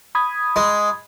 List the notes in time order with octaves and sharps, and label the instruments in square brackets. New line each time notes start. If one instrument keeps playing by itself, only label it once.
[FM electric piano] B5 D#6 G#6
[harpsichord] G#3